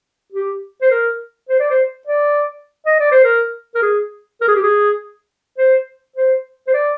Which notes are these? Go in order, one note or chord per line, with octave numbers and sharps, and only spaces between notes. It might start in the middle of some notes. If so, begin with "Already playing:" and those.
G4
C5
A#4
C5
D5
C5
D5
D#5
D5
C5
A#4
A#4
G#4
A#4
G#4
G4
G#4
C5
C5
C5
D5